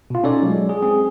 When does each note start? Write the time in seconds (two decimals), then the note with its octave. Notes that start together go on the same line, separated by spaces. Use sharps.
0.10 B2 F4
0.24 C#4 D#4 A4 C#5 D5
0.43 F#3 G#3
0.69 G#4
0.82 C4 G#4